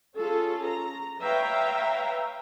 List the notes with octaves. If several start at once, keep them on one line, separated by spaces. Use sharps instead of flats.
C#4 F4 G#4 A4
A#5
B4 C#5 E5 F5 G5 A#5